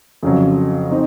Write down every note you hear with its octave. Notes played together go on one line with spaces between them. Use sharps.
F2 C#3 F#3
C4 D#4